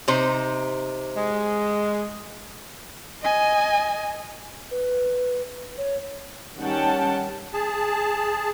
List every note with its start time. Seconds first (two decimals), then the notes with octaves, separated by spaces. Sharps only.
0.08 C3 D#4 C5
1.16 G#3
3.22 D#5 G#5
4.71 B4
5.78 C#5
6.59 D#3 G3 C#4 F#5 G5 A5
7.53 G#4 A5